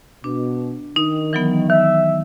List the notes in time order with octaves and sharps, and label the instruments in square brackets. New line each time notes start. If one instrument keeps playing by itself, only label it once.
[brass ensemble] B2 [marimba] D4
[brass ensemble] D#3 [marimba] D#4
[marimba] E3 F#3 B3
[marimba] D#3 [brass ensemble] E5